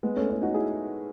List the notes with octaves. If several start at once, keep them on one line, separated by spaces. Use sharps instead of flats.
G#3 B3
A3 C#4
C#4 E4
D#4 F#4
E4 G#4